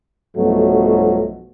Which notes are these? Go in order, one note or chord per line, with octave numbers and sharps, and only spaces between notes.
B1 G2 B2 F3 F#3 A3